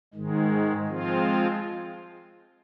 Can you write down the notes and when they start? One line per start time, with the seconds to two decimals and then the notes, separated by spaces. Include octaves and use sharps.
0.14 G#2 D#3 G#3
0.88 F3 G#3 C4 F4